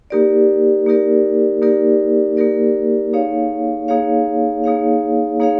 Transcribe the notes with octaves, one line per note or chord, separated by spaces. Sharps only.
A#3 D#4 G4 A#4 D5
A#3 D#4 G4 A#4 D5
A#3 D#4 G4 A#4 D5
A#3 D#4 G4 A#4 D5
A#3 D#4 G#4 C#5 F5
A#3 D#4 G#4 C#5 F5
A#3 D#4 G#4 C#5 F5
A#3 D#4 G#4 C#5 F5